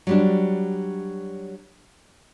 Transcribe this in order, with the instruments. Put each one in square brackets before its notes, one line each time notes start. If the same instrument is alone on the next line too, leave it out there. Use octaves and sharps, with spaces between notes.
[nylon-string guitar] F#3 G3 D4